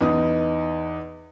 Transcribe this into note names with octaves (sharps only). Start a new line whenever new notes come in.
E2 D#4 B4 D#6